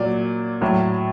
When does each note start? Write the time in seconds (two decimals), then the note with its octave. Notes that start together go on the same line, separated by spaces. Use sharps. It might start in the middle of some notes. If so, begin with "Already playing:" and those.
Already playing: A#2 F#3 D5
0.61 A2 F#3